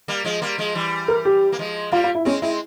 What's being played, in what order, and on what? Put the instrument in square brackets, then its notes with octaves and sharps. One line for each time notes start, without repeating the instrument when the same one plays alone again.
[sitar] G3 A#3
F3 G#3
G3 A#3
F3 G#3
E3 G3
[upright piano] A#4
G4
[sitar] A#3
F3 G#3
[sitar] G3 A#3 [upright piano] F4
[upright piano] F4
E4
[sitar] G#3 C4 [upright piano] C#4
[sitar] G#3 C4 [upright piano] E4